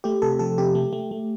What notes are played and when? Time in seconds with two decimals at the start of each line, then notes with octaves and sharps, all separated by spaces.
0.04 A3 G4
0.22 C3 A4
0.39 F3 A4
0.58 C3 G4
0.75 A3
0.93 A3
1.11 A3